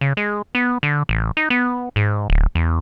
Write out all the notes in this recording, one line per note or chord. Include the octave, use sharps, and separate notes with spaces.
C#3
G#3
B3
D3
A1
D#4
B3
G#2
D1
E2